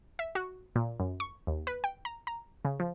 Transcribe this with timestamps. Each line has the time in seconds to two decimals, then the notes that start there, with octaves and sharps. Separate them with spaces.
0.19 E5
0.35 F#4
0.76 A#2
1.00 F#2
1.20 C#6
1.47 D#2
1.67 B4
1.84 G5
2.05 A#5
2.27 A#5
2.65 C#3
2.79 F3